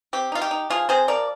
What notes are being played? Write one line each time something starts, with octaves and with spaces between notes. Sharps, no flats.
C4 G4
D#4 F4
G4
D#4
F3 F4 G#4
C3 G#4 C5
F3 A#4 D5